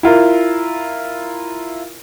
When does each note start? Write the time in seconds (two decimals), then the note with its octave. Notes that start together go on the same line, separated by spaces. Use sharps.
0.03 E4 F4 A#4